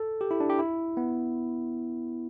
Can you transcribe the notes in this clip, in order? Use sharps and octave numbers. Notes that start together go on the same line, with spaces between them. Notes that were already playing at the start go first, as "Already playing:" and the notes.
Already playing: A4
G4
E4
D4
G4
E4
B3